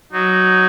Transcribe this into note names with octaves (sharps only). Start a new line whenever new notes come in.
F#3 D#4